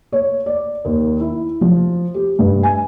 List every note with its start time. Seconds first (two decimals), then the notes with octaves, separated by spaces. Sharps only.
0.12 C#5
0.46 D5
0.85 D#2
1.20 E4
1.61 F3
2.14 G4
2.39 G2
2.63 G#5